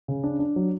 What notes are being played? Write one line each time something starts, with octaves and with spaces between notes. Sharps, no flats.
C#3
D4
D4
F#3